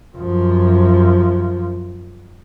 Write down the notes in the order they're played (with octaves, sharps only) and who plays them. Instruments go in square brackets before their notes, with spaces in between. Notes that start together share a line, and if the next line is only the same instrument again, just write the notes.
[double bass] F#2 F3